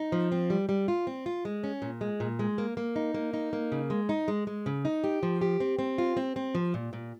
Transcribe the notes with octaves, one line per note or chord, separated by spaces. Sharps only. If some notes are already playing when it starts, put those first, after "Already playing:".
Already playing: D#4
F3
C4
G3
G3
F4
C4
F4
G#3
C#4
A#2
G#3
A#2
G#3
A#3
A#3
D#4
A#3
D#4
A#3
C#3
G#3
D#4
G#3
G#3
C#3
D#4
G4
F3
G4
C4
C4
F4
C4
C4
F3
A#2
A#2